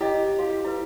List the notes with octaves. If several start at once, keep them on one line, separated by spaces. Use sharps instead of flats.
E4 G4 D#5
F#4 F5
E4 B4